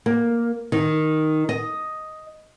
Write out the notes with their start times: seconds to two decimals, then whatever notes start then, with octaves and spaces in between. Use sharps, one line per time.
0.06 A#3
0.72 D#3
1.49 D#5